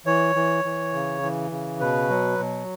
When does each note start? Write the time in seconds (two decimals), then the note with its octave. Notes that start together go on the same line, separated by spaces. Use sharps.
0.06 E3 C#5
0.35 E3
0.64 E3
0.93 C#3
1.22 E3
1.51 C#3
1.80 B2 B4
2.09 F#3
2.39 B2